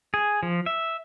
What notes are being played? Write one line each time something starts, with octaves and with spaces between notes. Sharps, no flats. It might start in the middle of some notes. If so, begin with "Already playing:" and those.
G#4
F3
E5